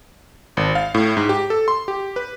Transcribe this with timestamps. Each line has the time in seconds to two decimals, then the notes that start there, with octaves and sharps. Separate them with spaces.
0.57 G#1
0.75 F5
0.94 A2
1.17 G#2
1.29 G4
1.50 A4
1.68 C6
1.88 G4
2.16 B4